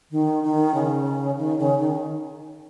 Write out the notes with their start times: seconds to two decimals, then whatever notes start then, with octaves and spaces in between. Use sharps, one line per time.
0.11 D#3
0.44 D#3
0.75 C#3
1.38 D#3
1.58 C#3
1.79 D#3